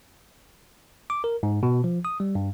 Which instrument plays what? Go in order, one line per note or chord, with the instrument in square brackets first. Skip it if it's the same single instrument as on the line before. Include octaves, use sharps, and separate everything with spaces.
[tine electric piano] D6
A#4
G#2
B2
F3
D#6
G3
G2